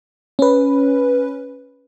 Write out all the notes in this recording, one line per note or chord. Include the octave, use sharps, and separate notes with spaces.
C#4 B4